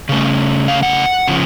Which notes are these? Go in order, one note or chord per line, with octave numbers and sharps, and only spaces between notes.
C#3 A3 C#4
F5
F#5
C#3 F3